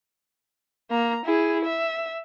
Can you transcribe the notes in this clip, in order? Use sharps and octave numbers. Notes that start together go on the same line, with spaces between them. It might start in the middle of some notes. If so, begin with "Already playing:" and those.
A#3 A#5
E4 G#4
E5